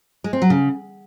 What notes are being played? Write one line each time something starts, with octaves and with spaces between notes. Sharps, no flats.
G#3
C4
F#3
C#3